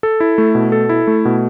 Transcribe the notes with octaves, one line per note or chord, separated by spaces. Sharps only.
A4
E4
A3
B2
A4
E4
A3
B2